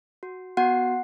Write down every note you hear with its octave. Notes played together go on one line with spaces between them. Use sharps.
F#4
B3 F#4 F#5